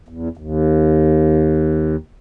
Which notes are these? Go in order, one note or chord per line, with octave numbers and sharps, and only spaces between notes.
E2
D#2